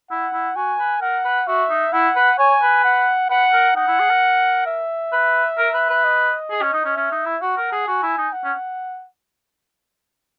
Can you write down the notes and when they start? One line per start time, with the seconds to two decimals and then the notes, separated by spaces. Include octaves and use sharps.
0.11 E4 F#5
0.33 E4
0.56 F#4 G#5
0.79 B4
1.01 A#4 F#5
1.25 B4
1.48 F#4 E5
1.70 D#4
1.93 E4 F#5
2.16 B4
2.39 C#5 G#5
2.62 B4
2.85 F#5
3.30 B4 F#5
3.53 A#4
3.76 D#4 F#5
3.88 E4
3.99 G#4
4.10 A#4
4.67 E5
5.13 B4
5.58 A#4
5.74 B4
5.90 B4
6.04 D#5
6.50 G#4
6.61 C#4
6.73 D#4
6.85 C#4
6.96 C#4 E5
7.12 D#4
7.26 E4
7.42 F#4 F#5
7.57 A#4
7.72 G#4
7.87 F#4 G#5
8.03 E4
8.18 D#4
8.32 F#5
8.44 C#4